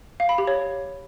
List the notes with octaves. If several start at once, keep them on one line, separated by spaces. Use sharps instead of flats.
F5
B5
G4
C#5